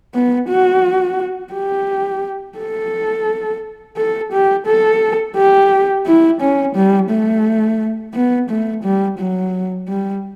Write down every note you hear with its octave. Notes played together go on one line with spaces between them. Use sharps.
B3
F#4
G4
A4
A4
G4
A4
G4
E4
C#4
G3
A3
B3
A3
G3
F#3
G3